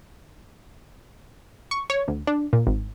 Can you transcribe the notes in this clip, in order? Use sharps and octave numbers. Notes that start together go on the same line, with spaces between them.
C#6
C#5
D2
D4
A#2
G#1